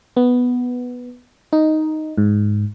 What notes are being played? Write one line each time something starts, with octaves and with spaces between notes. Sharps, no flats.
B3
D#4
G#2